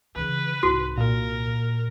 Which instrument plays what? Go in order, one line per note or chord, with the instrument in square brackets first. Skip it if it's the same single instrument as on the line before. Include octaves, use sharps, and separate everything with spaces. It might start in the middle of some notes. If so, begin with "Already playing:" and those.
[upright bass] C#3 E3 [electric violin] B4
[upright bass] C2 G#2 [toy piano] F#4
[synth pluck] A#2 [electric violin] A#4